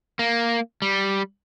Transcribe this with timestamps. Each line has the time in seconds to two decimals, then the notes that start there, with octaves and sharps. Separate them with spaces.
0.19 A#3
0.82 G3